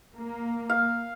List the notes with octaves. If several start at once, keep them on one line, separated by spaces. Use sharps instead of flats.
A#3
F5